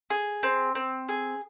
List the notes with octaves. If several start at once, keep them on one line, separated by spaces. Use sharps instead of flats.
G#4
C4
C4
G#4